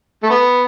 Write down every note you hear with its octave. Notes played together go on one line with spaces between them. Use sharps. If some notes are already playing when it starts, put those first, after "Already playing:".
A3
B3